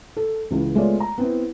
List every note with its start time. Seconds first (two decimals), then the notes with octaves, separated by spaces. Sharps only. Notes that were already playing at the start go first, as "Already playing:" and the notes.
0.17 A4
0.50 C#2 E3
0.75 G#3 A3 B3 F4 C#5 D5
1.00 A#5
1.18 B3 C4 E4